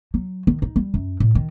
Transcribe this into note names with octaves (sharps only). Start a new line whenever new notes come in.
F#3
D#3
D#4
G3
F#2
A2
D#3